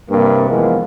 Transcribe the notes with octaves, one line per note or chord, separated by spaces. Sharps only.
G2 C3 A#3
E3 F3 G#3 A#3 B3